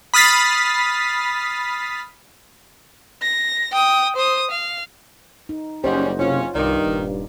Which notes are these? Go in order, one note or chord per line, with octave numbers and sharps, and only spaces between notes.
B5 D#6 F6 A6 B6 C7
A#6
G5 D#6
C5 D#6
F5
D#4
F#1 G3 C#4 C5 D#5 F#5
C3 C#4 F4 C#5
C2 G2 D#3 D#4 D5
D#1